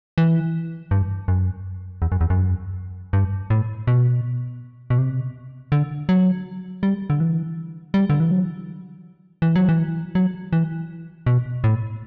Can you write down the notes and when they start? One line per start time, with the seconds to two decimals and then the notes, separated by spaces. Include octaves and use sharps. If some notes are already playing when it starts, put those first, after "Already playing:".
0.18 E3
0.91 G2
1.28 F#2
2.02 E2
2.12 F#2
2.21 E2
2.30 F#2
3.13 G2
3.50 A2
3.87 B2
4.90 B2
4.98 C3
5.72 D3
6.09 F#3
6.83 G3
7.10 D3
7.20 E3
7.94 G3
8.10 D3
8.20 E3
8.31 F#3
9.42 E3
9.55 F#3
9.69 E3
10.15 F#3
10.53 E3
11.27 B2
11.64 A2